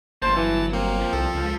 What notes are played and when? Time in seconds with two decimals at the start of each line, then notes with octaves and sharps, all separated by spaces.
0.22 G1 F3 A#3 C5 A5
0.36 E3 F#3
0.73 A#3 C4
1.00 F3
1.13 C2 A4
1.34 C#2